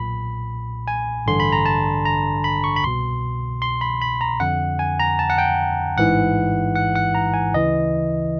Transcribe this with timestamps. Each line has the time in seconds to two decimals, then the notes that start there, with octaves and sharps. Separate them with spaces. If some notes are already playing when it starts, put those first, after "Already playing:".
Already playing: B1 A#2 B5
0.88 G#5
1.26 A1 G2 D3 C6
1.40 B5
1.52 A#5
1.66 A5
2.05 A#5
2.44 B5
2.64 C#6
2.76 B5
2.83 C2 B2 C6
3.62 C6
3.81 B5
4.02 B5
4.21 A#5
4.40 F2 D3 F#5
4.79 G#5
5.00 A#5
5.19 A5
5.30 F#5
5.38 G5
5.97 A1 G#2 E3 F#5
6.75 F#5
6.96 F#5
7.15 A#5
7.34 G#5
7.54 D2 C#3 E3 D#5